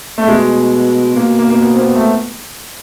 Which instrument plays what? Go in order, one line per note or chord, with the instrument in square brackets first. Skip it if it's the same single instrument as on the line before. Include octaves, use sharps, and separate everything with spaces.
[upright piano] A3
[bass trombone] B2 [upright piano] G#3
[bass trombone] B2 [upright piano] A#3
[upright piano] A#3
A#3
B3
A#3 C4
B3
A3